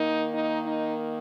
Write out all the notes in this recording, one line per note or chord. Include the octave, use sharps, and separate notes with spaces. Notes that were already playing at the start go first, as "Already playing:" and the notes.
Already playing: D#3 A#3 D#4
D#4
D#4